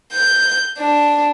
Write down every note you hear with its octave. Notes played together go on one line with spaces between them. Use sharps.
G6
D4